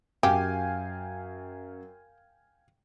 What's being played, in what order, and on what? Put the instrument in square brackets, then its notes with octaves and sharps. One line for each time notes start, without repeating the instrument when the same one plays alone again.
[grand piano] F#2 [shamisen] G4 [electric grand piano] F5 G5 G#5